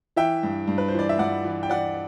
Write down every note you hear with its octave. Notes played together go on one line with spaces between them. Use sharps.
E3 E5 G5
G2
G2
B4
C5
E3 D5
E5
G2 D5 F#5
E3
G5
E3 D5 F#5